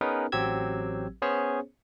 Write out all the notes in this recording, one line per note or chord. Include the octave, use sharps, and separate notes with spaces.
B3 C#4 D#4 G#4 A#4 B4
A1 F#3 C4 G4 E6 G#6
B3 C#4 G#4 C5 C#5